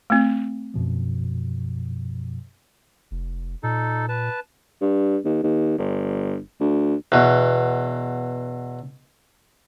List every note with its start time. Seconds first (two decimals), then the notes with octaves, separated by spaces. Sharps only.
0.10 A3 C4
0.74 F#2 B2 F3
3.11 F1
3.63 A#2 D#4 A4
4.09 B4 A5
4.81 G2
5.25 D#2
5.43 D#2
5.78 G1
6.60 D2
7.12 E2 B2